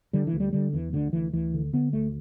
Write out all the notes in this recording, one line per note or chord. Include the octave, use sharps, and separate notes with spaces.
D3 G3
E3
D2
G3
D3 G3
E2 E3
D2 D3
D2 E3
D2 E3
D3
D3 B3
D2 A3